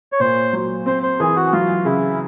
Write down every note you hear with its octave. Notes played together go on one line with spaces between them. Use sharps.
C#5
A#2 C5
F#3
C4 C5
C5
E3 G#4
F#4
F#3 F4
C#3 E4